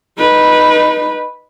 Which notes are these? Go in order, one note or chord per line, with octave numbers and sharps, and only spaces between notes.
D#4 B4